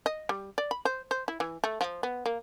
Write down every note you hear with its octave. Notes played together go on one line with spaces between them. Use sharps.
D#5
G3
D5
B5
C5
C5
E4
E3
A3
F3
B3
A#3